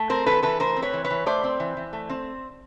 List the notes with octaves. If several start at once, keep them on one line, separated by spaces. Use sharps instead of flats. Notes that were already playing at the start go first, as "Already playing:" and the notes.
Already playing: A3
C4 A#4 C5
E3 A4 B4
E3 A4 B4
A3 A#4 C5
C4
B4 C#5
E3
B4 C#5
E3
A3 C5 D5
C4
E3
E3
A3
C4